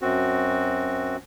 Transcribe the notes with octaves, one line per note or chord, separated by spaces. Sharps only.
F#2 C4 F#4